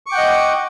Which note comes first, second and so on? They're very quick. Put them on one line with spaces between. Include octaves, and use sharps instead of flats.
C#6 D6 G5 F#5 D#5